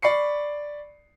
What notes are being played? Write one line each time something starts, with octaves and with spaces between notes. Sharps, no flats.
D5 B5 C#6 C7 C#7